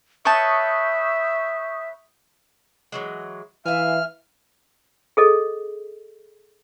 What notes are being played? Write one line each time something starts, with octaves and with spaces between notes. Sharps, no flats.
B4 C#5 E5 A5 C#6 D#6 G6
E3 F#3 G#3
E3 E5 F5 G#5 F6
G#4 A4 D#5